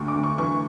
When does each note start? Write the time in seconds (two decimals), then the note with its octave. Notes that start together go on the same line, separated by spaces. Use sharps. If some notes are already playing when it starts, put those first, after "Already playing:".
Already playing: D2 D3 C#6
0.08 D6
0.15 D2
0.23 C#6
0.38 E3 C#6